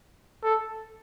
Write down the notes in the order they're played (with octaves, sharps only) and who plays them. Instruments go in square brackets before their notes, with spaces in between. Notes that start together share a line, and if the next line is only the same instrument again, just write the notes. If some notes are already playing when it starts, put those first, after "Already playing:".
[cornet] A4